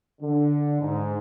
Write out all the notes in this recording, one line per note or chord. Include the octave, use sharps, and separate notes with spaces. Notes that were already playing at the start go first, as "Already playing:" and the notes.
D3
G#2